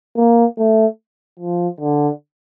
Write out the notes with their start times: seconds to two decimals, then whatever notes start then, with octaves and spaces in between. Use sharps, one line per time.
0.17 A#3
0.58 A3
1.39 F3
1.80 D3